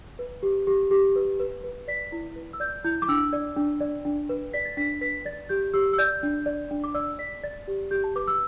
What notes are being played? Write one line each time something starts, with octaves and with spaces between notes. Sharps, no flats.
B4
G4
G4
G4
B4
B4
B4
D5 B6
E4
B4
E6
D5 G6
E4 G6
D6
D4 E6
D5
D4
D5
D4
B4
D5 B6
A6
D4 B6
B4 B6
D5 A6
G4 G6
G4 E6
E6
D5 G6
D4
D5
D4
D6
D5 E6
D5 B6
D5 A6
G4
G4 G6
A5
B4 D6
E6